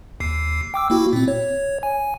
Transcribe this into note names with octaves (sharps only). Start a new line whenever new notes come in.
D#2 C7
G5 D6 E6
A#3 E4 F#4
A#2 C4
C#5
G#5